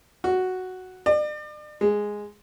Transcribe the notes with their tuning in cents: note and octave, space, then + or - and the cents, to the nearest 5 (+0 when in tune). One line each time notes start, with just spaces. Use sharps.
F#4 +0
D5 +40
G#3 -5